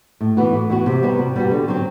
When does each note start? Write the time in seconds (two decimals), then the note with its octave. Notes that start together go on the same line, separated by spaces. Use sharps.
0.21 A2
0.37 E3 B3 F#4
0.53 A2
0.70 E3 B3 F#4
0.86 C3
1.03 G3 B3 F#4
1.18 C3
1.36 G3 B3 F#4
1.51 D3
1.68 F#3 C4